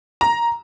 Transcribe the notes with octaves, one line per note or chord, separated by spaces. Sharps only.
A#5